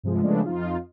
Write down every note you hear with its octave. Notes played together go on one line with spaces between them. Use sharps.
G2 C3 F3 G#3
C#3 F3 G#3 A3 B3 D4
F2 D#4 F4